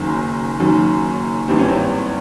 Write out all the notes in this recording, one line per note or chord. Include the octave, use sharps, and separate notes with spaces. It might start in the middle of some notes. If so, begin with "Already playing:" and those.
Already playing: F#1 F#2 D#3
F#1 F#2 D#3
G#1 G2 E3 G3 C4
C#4
C4